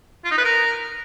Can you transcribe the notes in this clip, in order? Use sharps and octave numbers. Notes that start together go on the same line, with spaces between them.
F4
D#4
B4
A#4